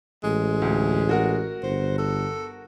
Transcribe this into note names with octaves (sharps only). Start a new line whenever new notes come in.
A1 G#3
D2
F#4 A#4 F#5
G1 C5
A4